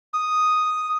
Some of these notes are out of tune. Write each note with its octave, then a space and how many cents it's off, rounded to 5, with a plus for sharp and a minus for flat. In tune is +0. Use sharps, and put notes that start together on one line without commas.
D#6 +0